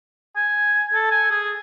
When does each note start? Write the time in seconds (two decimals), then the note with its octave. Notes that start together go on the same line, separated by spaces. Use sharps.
0.36 G#5
0.94 A4
1.11 G#5
1.31 G#4